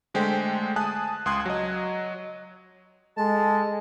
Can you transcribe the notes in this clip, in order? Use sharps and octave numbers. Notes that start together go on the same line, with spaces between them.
D3 G#3 A3 C5 G5 B6
G#5 A5 D#6 F#6
C#2 C6 D#6 F#6 G#6
F#3 D#5
G#3 A4 A5